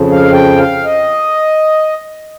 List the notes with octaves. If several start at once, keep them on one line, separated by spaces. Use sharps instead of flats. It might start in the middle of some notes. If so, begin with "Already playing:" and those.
Already playing: F2 C#3 F3
F5
G5
F5
D#5